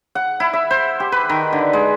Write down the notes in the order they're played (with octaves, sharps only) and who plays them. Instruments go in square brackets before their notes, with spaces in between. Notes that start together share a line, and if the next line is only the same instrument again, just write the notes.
[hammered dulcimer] F#5
E4
E5
C5
G4
B4
D#3
D3
G#3